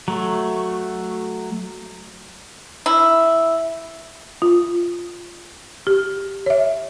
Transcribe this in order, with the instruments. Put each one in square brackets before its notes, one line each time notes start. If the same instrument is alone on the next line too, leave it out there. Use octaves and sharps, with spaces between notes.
[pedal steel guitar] F#3 A3
[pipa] E4
[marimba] F4
G4
C#5 E5